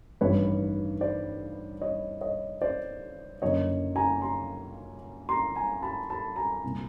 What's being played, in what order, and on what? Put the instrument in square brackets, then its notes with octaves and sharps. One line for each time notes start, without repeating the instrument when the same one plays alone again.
[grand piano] A1 G2 D#3 B4 C#5
C5 D5
C#5 D#5
C#5 D#5
C5 D5
F#1 F#2 D3 C#5 D#5
G#5 A#5
A#5 C6
A#5 C6
G#5 A#5
A5 B5
A5 B5
G#5 A#5
C2 A#2